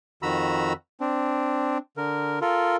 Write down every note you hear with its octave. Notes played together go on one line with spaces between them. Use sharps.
F2 D#3 F#4 A#5 B5 E6
C4 D4
D3 A#4
F4 A4 A#4